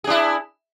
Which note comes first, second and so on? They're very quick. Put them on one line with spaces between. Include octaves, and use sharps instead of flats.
G#4 D4 E4